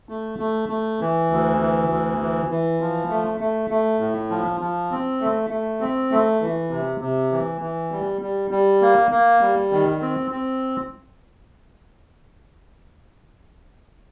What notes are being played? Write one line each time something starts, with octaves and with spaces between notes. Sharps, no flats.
A3
A3
A3
E3
D2
E3
D2
E3
E3
F3
A3
A3
A3
A2
F3
F3
C4
A3
A3
C4
A3
E3
C3
C3
E3
E3
G3
G3
G3
A#3
A#3
G3
D#3
C4
C4